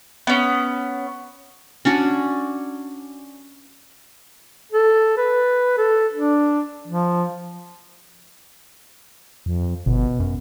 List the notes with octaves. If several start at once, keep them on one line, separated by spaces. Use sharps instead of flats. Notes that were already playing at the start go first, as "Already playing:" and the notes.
B3 C#4
C#4 D4 F#4
A4
B4
A4
D4
F3
F2
G1 B2
F#2